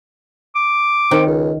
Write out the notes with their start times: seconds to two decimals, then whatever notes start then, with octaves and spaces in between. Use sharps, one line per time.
0.55 D6
1.11 D#3 C4
1.27 C#2